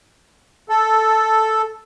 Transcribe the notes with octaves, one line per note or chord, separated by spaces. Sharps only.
A4